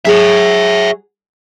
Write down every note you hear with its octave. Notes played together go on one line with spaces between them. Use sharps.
F#3 G#4 C#5 E5